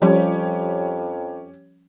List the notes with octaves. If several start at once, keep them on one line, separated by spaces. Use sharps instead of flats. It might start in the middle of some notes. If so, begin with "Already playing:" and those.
F2 F3 G3 C#4 G4 C#5